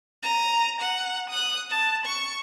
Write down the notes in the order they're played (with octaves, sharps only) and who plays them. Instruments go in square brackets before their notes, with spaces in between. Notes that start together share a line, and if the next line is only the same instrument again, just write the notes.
[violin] A#5 D#7
F#5
D#6 F#6
A5
C#6